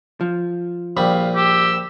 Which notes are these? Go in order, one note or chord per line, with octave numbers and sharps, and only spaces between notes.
F3
A#1 G3 F5 B5
G4 E6